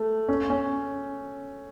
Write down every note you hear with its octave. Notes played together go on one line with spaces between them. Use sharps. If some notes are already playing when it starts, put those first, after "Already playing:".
Already playing: A3
C#4
C#4